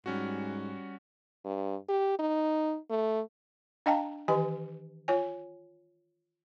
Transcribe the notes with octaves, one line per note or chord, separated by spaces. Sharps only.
G#2 G3 C#4 F#4
G2
G4
D#4
A3
D4 D#5 F5 G5 A5 A#5
D#3 E3 G4 D#5 G#5
F4 C#5 G#5